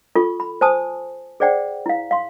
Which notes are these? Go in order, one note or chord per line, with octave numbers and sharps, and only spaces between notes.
F4 A4 C#6
B5
C5 G#5 A5 D#6
G#4 C5 D5 F#5 G5
E4 F5
F5 C6